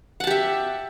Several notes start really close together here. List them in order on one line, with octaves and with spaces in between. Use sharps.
F#5 A5 G4 E5